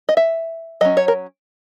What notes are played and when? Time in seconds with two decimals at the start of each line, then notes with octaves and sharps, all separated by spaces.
0.09 D#5
0.17 E5
0.81 F#3 C#4 D#5
0.97 C#5
1.08 A#4